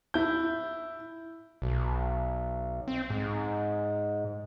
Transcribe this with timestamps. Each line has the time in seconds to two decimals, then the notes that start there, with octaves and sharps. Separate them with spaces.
0.14 E4 G6
1.62 B1
2.88 C4
3.10 G#2